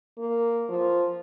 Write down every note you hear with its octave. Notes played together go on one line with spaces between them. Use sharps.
A#3
F3